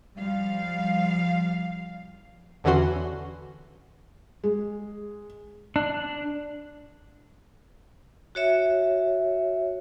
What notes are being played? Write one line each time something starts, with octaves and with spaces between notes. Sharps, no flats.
F3 G3 F5
E2 D3 E3 C#4 F#4 C6
G#3
D4
F#4 C#5 E5